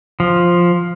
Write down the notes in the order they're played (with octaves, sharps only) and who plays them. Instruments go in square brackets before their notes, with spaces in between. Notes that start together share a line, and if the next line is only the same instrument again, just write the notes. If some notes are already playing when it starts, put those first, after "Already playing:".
[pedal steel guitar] F3